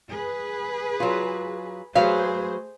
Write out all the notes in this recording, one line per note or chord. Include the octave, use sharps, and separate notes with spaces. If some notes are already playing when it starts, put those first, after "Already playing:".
G#4 B4
F#3 F4
F#3 A3 G#4 B4 C5 F5